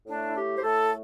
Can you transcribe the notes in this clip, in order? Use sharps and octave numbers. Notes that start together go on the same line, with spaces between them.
A2 A3 D4
E4
G4
C5
A2 A3 A4